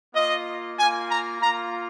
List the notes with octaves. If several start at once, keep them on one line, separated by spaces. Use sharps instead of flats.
A#3 F4 D#5
A#3 F4 G#5
A#5
A#3 F4 A#5